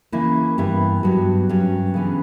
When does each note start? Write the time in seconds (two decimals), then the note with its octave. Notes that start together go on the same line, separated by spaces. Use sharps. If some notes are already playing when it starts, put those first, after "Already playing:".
0.12 C#3 E3 A#3 E4
0.58 G2 E3 B3 E4
1.03 G2 F#3 B3 D4
1.49 G2 F#3 C#4
1.94 C#3 E3 B3 D4